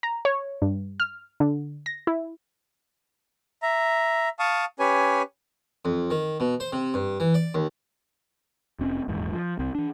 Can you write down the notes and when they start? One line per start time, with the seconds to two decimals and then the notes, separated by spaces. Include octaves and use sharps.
0.03 A#5
0.25 C#5
0.62 G2
1.00 F6
1.40 D3
1.86 A#6
2.07 E4
3.62 E5 A#5
4.39 F5 A5 C#6 D#6
4.80 C#4 G4 B4 C#5 G#5
5.85 F2
6.10 D#3
6.40 B2
6.60 C5
6.73 C3
6.94 G2
7.20 E3
7.34 D5
7.55 D#2
8.79 F1 C4 C#4
9.08 D#1 E2 G#2
9.33 F3
9.59 C2 C4
9.75 E3 D4